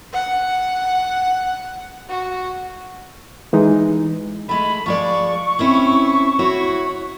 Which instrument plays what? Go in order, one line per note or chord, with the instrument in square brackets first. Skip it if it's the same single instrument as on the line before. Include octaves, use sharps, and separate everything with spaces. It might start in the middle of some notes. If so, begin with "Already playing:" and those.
[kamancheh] F#5
F#4
[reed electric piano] E3 G#3 D#4
[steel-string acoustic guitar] G#3 A3 [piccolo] B5
[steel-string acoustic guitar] F3 G#3 D5 [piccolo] C#6
[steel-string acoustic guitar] C4 C#4 E4
E4 F#4 C#5